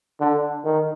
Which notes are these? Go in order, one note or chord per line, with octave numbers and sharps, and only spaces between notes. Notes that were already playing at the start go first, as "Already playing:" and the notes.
D3
D#3